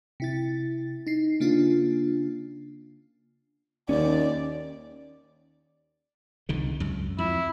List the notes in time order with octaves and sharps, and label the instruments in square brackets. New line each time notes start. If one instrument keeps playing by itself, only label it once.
[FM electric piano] C3 E4 A6
D#4 C7
C#3 A#3 D4 F4
[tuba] D#2 [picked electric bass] C#4 [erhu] D5
[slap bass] C2 D3 D#3
C#2 F#2
[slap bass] F2 [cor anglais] E4